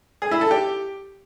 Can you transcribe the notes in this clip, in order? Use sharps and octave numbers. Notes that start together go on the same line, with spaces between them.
G#4
E4
A4
G4